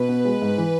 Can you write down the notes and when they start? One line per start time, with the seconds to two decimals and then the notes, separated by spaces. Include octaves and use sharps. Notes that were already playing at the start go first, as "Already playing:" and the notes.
Already playing: B2 B4
0.09 B3
0.25 G#3
0.42 G#2
0.58 E3